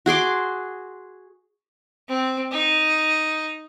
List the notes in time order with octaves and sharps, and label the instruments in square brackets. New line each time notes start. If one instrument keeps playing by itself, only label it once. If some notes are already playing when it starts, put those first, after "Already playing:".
[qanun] F#4 G#4 C6 D6
[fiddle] C4
D#4